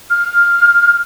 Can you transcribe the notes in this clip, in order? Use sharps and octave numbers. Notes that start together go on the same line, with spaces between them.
F6